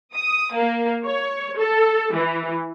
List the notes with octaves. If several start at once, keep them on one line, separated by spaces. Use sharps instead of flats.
D#6
A#3
C#5
A4
E3